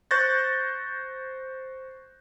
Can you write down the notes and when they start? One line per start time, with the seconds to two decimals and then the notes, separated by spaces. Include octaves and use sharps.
0.11 C5 C#6 F#6 G6 A6 A#6